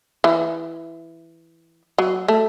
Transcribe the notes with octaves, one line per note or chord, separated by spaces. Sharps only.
E3
F#3
A3